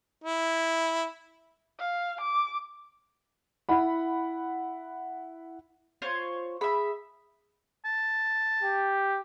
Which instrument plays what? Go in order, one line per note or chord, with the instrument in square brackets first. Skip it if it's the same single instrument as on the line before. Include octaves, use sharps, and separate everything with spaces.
[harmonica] E4
[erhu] F5
D6
[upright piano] E4 F#5 B5
[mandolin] F4 C5 C#5
[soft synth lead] G#4 [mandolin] E5 B5
[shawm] A5
[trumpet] G4